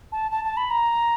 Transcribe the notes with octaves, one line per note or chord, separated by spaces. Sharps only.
A5
A5
A5
B5
A#5